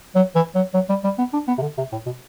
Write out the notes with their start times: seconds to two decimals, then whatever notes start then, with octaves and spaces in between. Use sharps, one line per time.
0.15 F#3
0.35 E3
0.55 F#3
0.74 F#3
0.89 G3
1.04 G3
1.18 B3
1.33 D4
1.48 B3
1.58 C3
1.62 D3
1.78 C3
1.92 A2
2.06 B2